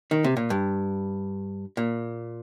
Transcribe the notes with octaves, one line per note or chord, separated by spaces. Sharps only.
D#3
C3
A#2
G2
A#2